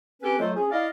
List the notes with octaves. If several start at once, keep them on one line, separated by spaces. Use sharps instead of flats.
C4 C#4 G4 A4 B4
F#3 A3 F4 A4 C5 D#5
C#4 G#4
E4 D5 D#5 F5